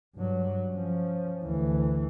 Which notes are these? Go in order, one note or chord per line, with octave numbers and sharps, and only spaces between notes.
G2 F#3
F3 C#4
D2 E3